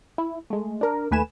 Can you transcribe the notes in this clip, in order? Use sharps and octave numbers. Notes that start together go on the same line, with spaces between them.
E4
G#3 A3
D4 A#4
D#2 A3 B4 G#5 E7